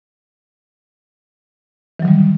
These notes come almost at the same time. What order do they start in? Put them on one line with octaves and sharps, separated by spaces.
E3 F#3 D#3 G3